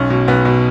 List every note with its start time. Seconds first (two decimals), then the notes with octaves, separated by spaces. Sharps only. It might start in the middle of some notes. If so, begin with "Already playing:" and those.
Already playing: B1 C#4
0.10 B2
0.28 B1 B3
0.45 B2